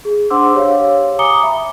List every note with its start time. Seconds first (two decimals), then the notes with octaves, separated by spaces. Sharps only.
0.05 G#4
0.30 D4 C5 F#5 C6 D6 E6
0.54 G4 C#5 F5
1.19 G#5 A#5 D6 D#6 C#7 G7
1.43 E5 B5